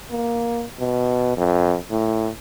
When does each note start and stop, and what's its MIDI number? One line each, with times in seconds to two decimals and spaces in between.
0.11 0.64 58
0.79 1.33 47
1.37 1.76 41
1.90 2.29 45